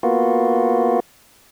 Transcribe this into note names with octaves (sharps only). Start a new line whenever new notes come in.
A#3 B3 F4 F#4